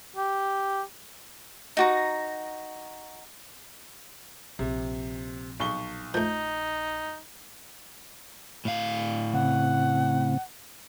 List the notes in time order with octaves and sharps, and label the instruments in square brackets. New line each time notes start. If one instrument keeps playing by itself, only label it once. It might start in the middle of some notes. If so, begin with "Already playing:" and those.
[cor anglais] G4
[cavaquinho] D#4 F#4 A#5
[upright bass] A#1 [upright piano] C3
[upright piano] B1 C#6 G7
[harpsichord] F3 A3 [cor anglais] D#4 [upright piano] G6
[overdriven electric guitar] A2 F5
[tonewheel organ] C#3 C4 [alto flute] F#5